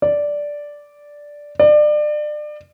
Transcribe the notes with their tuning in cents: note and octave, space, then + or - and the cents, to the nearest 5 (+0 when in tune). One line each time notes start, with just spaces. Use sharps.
D5 -5
D5 +30